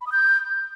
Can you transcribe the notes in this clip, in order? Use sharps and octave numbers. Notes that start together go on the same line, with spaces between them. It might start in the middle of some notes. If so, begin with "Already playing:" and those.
B5
D#6
G6